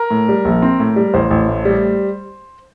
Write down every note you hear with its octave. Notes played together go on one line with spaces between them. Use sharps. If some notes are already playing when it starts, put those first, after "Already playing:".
Already playing: A#4
A2
G3
A#1
C4
A2
G3
A1 C5
A1
A2
G3